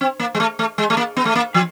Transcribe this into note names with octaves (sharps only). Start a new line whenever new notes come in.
C4
A#3
G#3
A3
A3
G#3
A3
A#3
B3
A3
A#3
F3